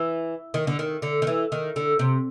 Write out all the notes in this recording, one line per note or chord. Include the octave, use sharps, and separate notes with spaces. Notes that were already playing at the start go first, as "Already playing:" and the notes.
Already playing: E3
D#3
D3
D#3
D3
D#3
E3
D#3
D3
C3